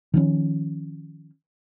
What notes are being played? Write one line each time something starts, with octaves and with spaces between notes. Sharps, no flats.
D#3 F3 C#4